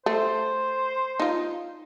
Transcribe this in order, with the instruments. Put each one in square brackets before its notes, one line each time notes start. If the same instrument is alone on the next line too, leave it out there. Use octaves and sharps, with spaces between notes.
[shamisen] A3 [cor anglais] C5
[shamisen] D#4 F4